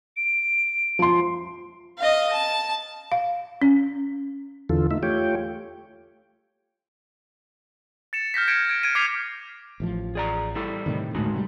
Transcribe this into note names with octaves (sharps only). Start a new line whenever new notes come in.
D7
F3 C6
D#5 F5
A5
F5
C#4
E2 D3 E3 F4 A4
A3 D#4 E5
A3 F4 G4 C#5 G5
A6 C#7 E7
F6 G6 A#6 B6
G6 G#6 A#6 C#7 D7
G#6 D7
G#6 D7 D#7
D6 F6 G#6 B6 C7 F7
A1 A2 F3
G#4 D5 A#5
G3 E4 A4
A2 C3 D#3
D2 A2 G#3 D#4 F#4
C3 G3